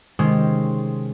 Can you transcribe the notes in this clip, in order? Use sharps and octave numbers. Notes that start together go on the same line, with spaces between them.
C3 D#3 G#3 C#4 C5